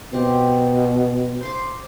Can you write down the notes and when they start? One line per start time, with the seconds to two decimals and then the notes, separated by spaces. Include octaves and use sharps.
0.13 B2 C4 G4
1.41 C5 C6 D6